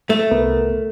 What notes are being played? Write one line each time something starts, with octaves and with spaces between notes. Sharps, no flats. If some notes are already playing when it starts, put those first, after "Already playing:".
A3
C2 B3 A#4